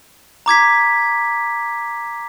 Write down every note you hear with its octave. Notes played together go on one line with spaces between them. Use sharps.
A#5 D6 G#6 B6